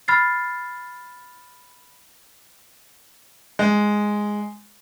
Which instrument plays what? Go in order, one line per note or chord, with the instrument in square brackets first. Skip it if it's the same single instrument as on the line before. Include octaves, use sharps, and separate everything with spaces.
[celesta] B5 F6 A6 C7
[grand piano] G#3